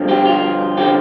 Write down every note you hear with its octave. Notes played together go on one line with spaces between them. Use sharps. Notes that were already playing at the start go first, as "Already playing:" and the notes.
Already playing: G2 D3 F3
G4
F4
D3 F3 G4